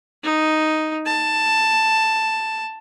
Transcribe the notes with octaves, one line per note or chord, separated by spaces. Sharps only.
D#4
A5